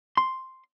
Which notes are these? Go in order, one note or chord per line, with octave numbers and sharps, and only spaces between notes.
C6